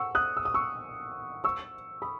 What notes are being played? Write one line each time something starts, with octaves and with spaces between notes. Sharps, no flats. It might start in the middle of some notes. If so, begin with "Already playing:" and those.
Already playing: F#5 C#6 E6
D#6 F#6
E6
D#6
C#6 E6
C#6 E6
B5 D#6